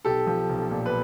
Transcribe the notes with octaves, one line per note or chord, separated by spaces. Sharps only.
B1 G4 A4
F3
B1
A#2
B4